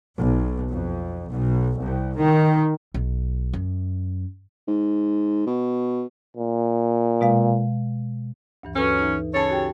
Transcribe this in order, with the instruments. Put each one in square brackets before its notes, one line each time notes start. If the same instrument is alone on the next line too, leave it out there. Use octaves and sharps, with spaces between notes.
[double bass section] B1
F2
B1
C2
D#3
[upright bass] B1
F#2
[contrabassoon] G#2
B2
[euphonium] A#2
[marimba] B2 G#3 F5
D2 G2 E3
[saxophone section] F#3 C#4 [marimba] A4 B4
[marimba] E3 D#4
[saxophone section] C#3 A4 C#5 [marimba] A5 A6
[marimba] F#4 G4 G5